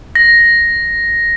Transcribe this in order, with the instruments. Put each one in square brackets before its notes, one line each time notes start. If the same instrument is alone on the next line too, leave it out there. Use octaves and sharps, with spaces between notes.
[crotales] A#6